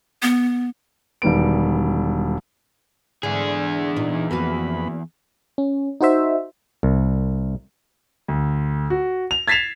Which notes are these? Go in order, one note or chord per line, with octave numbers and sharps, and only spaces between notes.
B3
E1 D#3 G3 B3 D7
E2 G#2 D3 G#4
A#2 E3 D#4
F2 A#3 B3 F#4 B4 B5
C#4
D#4 F#4 C5 E5
C2
D2
F#4
F7
G#6 A6 B6 C7 E7 F7